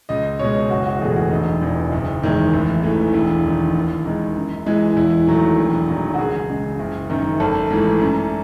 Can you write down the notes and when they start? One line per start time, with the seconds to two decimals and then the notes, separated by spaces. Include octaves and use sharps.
0.09 C#2 D#5
0.39 B2 G#3 C#5
0.70 F#1 F#4
0.86 F#4
1.01 E2 B2 A3 G#4
1.16 F#4
1.31 E1 D#4
1.61 E2 B2
1.92 F#1
2.23 E2 D#3 G#3
2.53 A1
2.83 G#2 E3 A3
3.13 E1 E4
3.44 D#2 D#3
3.75 D#2
4.06 D#3 G#3
4.36 F#2
4.66 E3 G#3
4.96 E2 E4
5.27 D#3 F#3 A3
5.58 E1
5.88 E2 D#3 F#3
6.14 F#4
6.19 C#2 G#4
6.50 C#3 G#3
6.79 F#1
7.10 F#2 D#3
7.40 G#1 A4
7.71 G#2 E3 A3
8.01 F#2